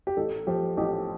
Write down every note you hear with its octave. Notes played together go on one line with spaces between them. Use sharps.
G4
A1 A4
F3 G4
A1 G4